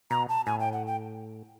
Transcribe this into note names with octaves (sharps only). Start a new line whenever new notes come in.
B2 A#5
A5
A2 G#5
G5
F#5
G5